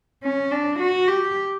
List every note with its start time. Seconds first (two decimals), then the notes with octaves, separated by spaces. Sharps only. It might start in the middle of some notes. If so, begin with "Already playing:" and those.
0.23 C#4
0.51 D4
0.79 F#4
1.08 G4